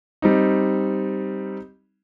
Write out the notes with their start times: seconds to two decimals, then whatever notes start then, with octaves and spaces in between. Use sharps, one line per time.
0.22 G3 C4 D#4